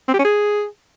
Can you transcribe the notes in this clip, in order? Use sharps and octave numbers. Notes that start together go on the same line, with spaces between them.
C4
G4
C#4
G#4